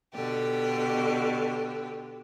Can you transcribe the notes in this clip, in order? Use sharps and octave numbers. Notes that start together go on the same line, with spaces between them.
B2 D3 G4